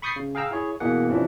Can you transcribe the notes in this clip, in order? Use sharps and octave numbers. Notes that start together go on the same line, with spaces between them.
B5 C#6 D#6 G6 A6 C7
C#3
G#4 F5 G5 A#5 E6
E4 G#4 C#5
B2 E3 A#3 G#4 F#5
C3 E3 F3 C#4 D4